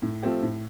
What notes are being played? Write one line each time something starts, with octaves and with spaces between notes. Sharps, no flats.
A2
F3 A3 C4 G4
A2